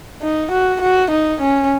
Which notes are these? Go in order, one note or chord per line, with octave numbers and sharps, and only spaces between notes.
D#4
F#4
F#4
D#4
C#4